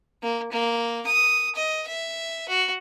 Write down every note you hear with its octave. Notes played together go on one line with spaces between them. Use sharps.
A#3
A#3
D#6
D#5
E5
F#4